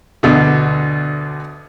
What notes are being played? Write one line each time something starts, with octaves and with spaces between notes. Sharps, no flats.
D2 B2 D3